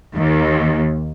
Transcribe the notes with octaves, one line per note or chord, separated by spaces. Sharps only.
D#2